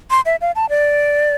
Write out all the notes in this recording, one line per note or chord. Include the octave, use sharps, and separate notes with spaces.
C6
E5
F5
A5
D5